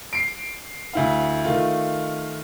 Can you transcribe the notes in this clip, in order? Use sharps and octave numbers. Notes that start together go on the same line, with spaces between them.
C7 D7
D2 E4 F5
D#3 A3 F4